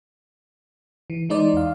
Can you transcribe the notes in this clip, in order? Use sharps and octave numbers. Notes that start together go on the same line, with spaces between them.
E3
E3 G#3 D#4 C5 D5
E2 F5